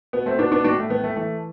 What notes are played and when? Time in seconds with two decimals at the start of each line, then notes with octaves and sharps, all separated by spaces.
0.13 B2 B3
0.26 A3 C4
0.39 B2 B3 D4
0.52 B3 D4
0.64 A2 D4 F#4
0.78 A3
0.90 A2 B3
1.04 A3
1.16 E3 A3